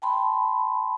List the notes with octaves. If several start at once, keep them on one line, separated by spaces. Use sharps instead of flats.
G5 A5 B5 C6